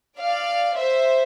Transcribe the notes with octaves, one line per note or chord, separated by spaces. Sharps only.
D5 F5
C5 E5